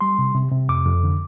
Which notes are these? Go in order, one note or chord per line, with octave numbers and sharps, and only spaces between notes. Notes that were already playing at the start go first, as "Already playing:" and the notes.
G3 C6
C3
C3
C3
F2 D6
F2
D3